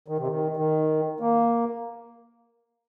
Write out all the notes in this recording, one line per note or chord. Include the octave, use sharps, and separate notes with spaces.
D#3
C3
D#3
D#3
A#3